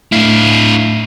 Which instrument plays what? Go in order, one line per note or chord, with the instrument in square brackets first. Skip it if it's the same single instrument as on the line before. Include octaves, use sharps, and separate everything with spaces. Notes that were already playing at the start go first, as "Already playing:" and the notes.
[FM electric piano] A2 F5 C7 [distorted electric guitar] D4 E4